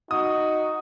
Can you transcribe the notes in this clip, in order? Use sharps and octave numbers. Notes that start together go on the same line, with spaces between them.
D#4 F#4 D#6